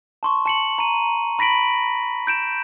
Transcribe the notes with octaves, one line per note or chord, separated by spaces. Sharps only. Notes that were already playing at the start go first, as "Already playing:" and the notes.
A5 C6 C#6
A5 C#7 F#7
A#5 D#7
B5 A#6 B6 D7 F#7
G6 D7 E7